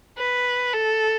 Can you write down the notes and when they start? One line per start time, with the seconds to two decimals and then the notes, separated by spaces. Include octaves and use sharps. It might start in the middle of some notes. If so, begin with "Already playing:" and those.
0.18 B4
0.73 A4